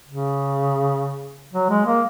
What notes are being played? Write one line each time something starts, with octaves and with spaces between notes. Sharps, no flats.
C#3
F#3
G#3
A#3